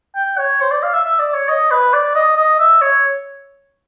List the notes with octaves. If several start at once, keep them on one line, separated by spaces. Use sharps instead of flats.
G5
C#5
C5
D5
F5
E5
E5
D5
C#5
D#5
B4
D5
D#5
D#5
E5
C#5